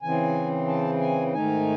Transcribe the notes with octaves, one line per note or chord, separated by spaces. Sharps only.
C#3 E3 C4 G#5
A5
G#5
G#2 D#3 A3 D#4 G#5